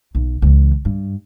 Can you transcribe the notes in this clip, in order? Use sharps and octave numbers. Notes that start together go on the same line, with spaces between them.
B1
C#2 E3
G2